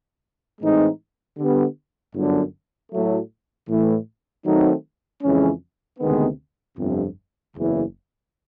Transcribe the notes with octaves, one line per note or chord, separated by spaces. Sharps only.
A2 E3 G#3 C4 D#4
D3 G3 B3
G1 F#2 D3
A2 F#3 A3
A2 E3 A3
D#3 F#3 A3 C4 D#4
F2 C#3 E3 G#3 C#4
D2 C3 D#3 G#3 B3
G1 F2 C3
F#1 E2 C#3 E3